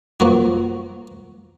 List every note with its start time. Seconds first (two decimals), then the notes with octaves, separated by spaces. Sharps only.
0.20 F3 A#3 F#4